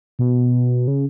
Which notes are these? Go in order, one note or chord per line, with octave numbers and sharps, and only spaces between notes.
B2
C#3